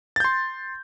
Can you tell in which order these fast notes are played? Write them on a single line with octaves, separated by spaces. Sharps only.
A6 G6 C6